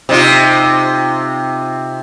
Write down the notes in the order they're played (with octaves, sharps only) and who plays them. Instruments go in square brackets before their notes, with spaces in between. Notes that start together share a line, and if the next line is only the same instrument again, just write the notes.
[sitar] C3 D#4 F4